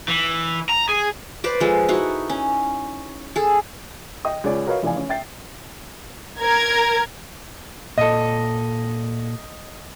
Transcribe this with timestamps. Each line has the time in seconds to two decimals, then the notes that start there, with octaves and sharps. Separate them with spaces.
0.08 E3
0.69 A#5
0.89 G#4
1.44 B4 C5 D5
1.60 F3 G#3 A4
1.89 D#4 E4 F#4
2.29 C#4
3.36 G#4 A4
4.25 D#5 G5 D#6
4.44 C#2 C#3 G#4 C#5 D5
4.66 F#4 A#4 B4 C#5 D#5 F5
4.82 F1 C#3 E3 D5 F5 G#5
4.97 C#4
5.09 E5 G5 A6 C7
6.40 A#4 G#6
7.98 A#2 A4 D#5